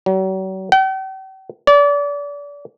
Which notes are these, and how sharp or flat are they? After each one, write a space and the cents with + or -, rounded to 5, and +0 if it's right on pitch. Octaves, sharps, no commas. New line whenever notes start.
F#3 +40
G5 -45
D5 -30